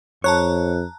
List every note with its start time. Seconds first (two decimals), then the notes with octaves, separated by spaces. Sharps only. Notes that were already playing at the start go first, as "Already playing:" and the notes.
0.24 F2 C#5 A5 A#5 F#6